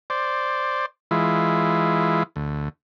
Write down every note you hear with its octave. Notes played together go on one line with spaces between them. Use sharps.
C5 D5
E3 G#3 E4 F4
D2